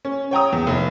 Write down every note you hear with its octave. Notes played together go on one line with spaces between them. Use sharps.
C#4
C#5 G5 A#5 D#6
E2
F1